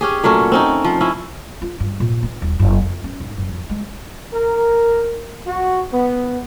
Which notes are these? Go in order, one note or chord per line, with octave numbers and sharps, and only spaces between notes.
C#4 G4 G#4
A#2 F#3 A3 C#4
C4 C#4 D#4
F3
C#4 E4
F4
G2
A#2
B3
D#1
F#1
F2
C#4
G#2
F#1
F2
G#3
A#4
F#4
B3